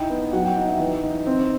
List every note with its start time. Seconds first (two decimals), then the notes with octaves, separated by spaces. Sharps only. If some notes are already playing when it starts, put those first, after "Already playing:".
Already playing: D#4 E4 G5
0.10 B3
0.33 F#3 F#5
0.44 G5
0.56 D#4 F#5
0.68 E5
0.80 E3
1.03 D#4
1.26 C4